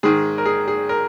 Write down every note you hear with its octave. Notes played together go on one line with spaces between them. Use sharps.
G#2 D#3 G#4
A#4
G#4
G#4
A#4